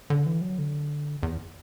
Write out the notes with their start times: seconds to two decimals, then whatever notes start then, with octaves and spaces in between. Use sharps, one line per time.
0.10 D3
0.26 E3
0.41 F#3
0.58 D3
1.23 E2